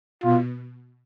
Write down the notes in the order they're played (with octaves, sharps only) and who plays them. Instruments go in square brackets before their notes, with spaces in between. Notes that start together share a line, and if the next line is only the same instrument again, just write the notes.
[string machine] B2 [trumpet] F4